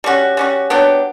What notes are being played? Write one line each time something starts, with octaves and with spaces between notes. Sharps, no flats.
G3 C#4 F#4
G3 C#4 F#4
F#3 B3 D4 G4